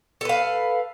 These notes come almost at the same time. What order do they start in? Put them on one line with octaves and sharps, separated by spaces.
A4 B4 F5